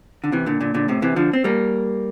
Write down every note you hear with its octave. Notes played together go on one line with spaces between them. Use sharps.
D3
C3 E3
A#2 D3
A#2 D3
A#2 D3
A2 C3
C3 E3
D3 F3
C4
G3 A#3